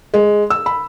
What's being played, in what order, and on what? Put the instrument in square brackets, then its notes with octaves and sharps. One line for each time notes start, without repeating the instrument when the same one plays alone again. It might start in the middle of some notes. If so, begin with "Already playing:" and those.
[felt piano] G#3
E6
B5